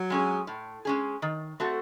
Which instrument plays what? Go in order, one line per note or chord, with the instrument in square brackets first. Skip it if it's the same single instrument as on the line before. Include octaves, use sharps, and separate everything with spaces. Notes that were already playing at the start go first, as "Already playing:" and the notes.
Already playing: [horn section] F#3
[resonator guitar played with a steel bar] G#3 C#4 G#4
A2
G#3 C#4 G#4
D#3
A3 C4 F#4 A4